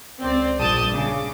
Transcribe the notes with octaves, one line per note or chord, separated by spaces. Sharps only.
C#2 C4 D5
A#1 G2 D5 A5 D#6 G6
C#3 D6